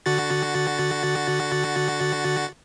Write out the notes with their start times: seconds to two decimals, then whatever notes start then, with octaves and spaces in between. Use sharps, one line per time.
0.06 D3 F#4 A6